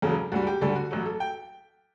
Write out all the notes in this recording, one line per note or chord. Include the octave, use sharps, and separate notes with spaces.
E1 E2 C#3 F#3 A4
D2 D3 G3 F#4
G4
D2 D3 G3 A4
F#4
A1 A2 F#3
A4
G5